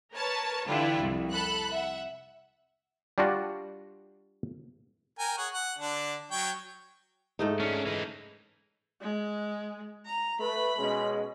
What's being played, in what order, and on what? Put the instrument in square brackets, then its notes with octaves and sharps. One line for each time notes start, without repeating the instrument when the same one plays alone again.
[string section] A#4 B4 C#5 A5
D3 E3 G3 D4 E4 F4
C2 F2
A4 B5 F#6
E5 F#5
[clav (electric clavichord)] G3 D4 F4 F#4
[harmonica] A#4 G5 G#5
G#4 C#5 F#5
F#5
D3 D4
F#3 C#5 G5
[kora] G#2 A3 D#4
[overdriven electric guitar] C#4 D4
E3 D#4
[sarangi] G#3
A#5
[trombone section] A3 B4 [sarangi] B5
[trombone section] B2 G#3 C#4